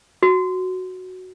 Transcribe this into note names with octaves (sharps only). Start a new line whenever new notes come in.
F#4